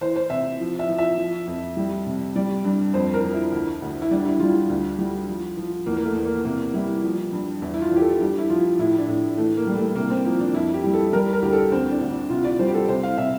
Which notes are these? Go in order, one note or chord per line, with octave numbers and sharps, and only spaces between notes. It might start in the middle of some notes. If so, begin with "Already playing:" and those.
E3 C5
C5
C3 E5
F3
E5
F3
E5
F3
F2
G3
C3
G3 D5
G2
F2 C5
A#4
F3
E4
D2
D2
E4
G3 D4
E4
G3 F4
F4
D2
G3
F3
F3
E2 A#3
A#3
A3
E2
A#3
C3 A#3
G3 E4
F3
G2
E2 E4
E4
F4
E2 G4
A4
G2 G4
E4
F3 F4
A2 E4
D4
A2
E3 A3
A#3
G3
A3
C3 A#3
C4
F3 A#3
D4
F2 E4
G4
G3
A4
G3 A#4
A#4
D2 G4
A4
D2 C4
D4
D2
D4
C3 F4
D5
G3 C5
G4
A4
C3 C5
F5
C3 E5